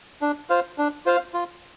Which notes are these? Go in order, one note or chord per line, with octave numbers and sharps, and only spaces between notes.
D4
F4 C5 F5
D4
F4 C5 F5
F4